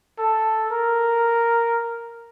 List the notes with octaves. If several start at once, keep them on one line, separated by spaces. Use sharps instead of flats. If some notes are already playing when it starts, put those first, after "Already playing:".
A4
A#4